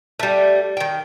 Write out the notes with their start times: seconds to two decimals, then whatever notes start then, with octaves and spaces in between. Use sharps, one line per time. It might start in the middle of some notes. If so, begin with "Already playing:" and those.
0.19 G3 A3
0.77 D#3 G5